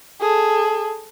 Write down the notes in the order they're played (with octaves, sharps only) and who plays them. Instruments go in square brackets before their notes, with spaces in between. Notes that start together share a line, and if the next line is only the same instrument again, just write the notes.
[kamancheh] G#4 A4